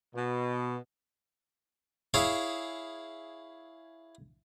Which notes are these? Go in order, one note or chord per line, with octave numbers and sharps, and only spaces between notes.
B2
E4 G#4 C#5 F5